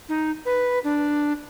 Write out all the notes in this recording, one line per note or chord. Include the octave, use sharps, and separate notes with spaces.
D#4
B4
D4